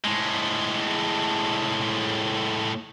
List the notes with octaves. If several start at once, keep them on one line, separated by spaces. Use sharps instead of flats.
A2 G#3